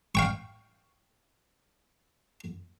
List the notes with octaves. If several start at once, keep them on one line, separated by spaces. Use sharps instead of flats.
F5 G5 C#6